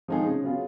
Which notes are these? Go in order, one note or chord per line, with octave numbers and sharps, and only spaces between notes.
F3 G#3 D#4 G#4
C#3
F#3 B3 F4 G#4